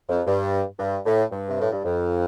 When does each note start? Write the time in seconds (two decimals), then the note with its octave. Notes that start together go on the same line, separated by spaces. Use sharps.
0.09 F2
0.26 G2
0.79 G2
1.06 A2
1.31 G2
1.47 C3
1.59 A2
1.72 G2
1.85 F2